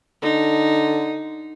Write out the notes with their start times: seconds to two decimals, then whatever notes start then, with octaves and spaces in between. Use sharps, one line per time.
0.23 D3 D#4